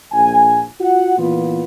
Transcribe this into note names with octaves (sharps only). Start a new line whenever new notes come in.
A#1 G#5
F4 F#4 F#5
A#2 E3 B3 F4